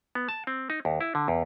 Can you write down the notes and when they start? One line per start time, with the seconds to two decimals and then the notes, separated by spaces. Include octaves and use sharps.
0.15 B3
0.29 A5
0.47 C4
0.70 D#4
0.85 D#2
1.01 E4
1.15 D3
1.28 E2